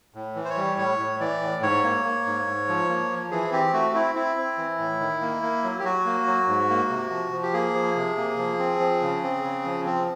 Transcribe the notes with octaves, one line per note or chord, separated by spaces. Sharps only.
A2
E3
C5
C#5
G3
A2 C#5
A2
E3 D5
A2
G#2 C#5
A#3
A#3
G#2
G#2
F3
A#3
F3
E3 G#4
C4 G4
A3 F#4
C4 E4
C4 E4
C4
E3
A2
D#3
A#3
A#3
F#3
G4
F#3 F#4
A#3
F#3
G#2
A#3
C3
F3
F3
G4
A#3 G#4
F3
C3
A#3
F3
C4
F3
C#3
C4
C#3
F3
C4